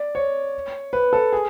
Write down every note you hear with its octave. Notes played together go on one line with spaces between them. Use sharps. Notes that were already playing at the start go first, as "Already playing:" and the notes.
Already playing: D5
C#5
B4
A4
G#4